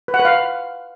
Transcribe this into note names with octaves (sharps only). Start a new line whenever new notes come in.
B4
F#5
B4
F5